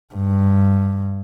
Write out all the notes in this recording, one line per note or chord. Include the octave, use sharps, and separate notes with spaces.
G2